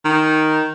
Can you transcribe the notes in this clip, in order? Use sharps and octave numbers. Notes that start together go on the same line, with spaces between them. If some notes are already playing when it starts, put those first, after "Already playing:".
D#3